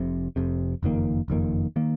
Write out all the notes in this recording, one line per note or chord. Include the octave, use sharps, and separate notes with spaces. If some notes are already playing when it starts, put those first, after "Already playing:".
Already playing: F1 F2 C3
F1 F2 C3
F#1 F2 D#3 A#3
F#1 F2 D#3 A#3
D#3 A#3